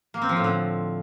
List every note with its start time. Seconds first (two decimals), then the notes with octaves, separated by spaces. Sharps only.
0.14 A#3
0.22 C4
0.29 F3
0.37 A2
0.44 D3